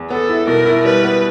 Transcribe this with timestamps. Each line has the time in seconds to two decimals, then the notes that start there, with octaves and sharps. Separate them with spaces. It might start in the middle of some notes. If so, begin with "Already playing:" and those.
Already playing: E2
0.10 B3 A4
0.29 E4
0.47 B2 A#4
0.66 E4
0.85 G3 B4
1.04 B3